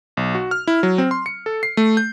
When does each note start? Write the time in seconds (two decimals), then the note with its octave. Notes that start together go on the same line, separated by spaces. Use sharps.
0.17 B1
0.35 F#4
0.51 F6
0.67 E4
0.83 F#3
0.98 C4
1.11 C6
1.26 C#7
1.46 A4
1.63 C7
1.77 A3
1.97 G6